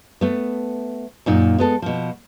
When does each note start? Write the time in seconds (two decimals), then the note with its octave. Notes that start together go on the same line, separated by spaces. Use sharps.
0.21 A3 B3
1.26 F#2 A#2 D#4
1.58 G#3 B3 A4
1.82 B2 F3